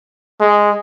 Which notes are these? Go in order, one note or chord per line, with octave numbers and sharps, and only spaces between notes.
G#3